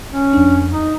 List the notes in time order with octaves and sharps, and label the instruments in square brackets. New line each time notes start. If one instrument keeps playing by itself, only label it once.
[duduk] C#4
[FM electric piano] F2 D4
[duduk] D#4